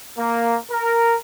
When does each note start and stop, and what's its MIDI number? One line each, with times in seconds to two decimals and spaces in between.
0.17 0.56 58
0.71 1.14 70